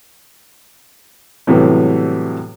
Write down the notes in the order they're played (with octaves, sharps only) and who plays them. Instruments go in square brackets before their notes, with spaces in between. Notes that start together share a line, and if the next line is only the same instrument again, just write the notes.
[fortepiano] A2 C3 E3 F#3 G3 B3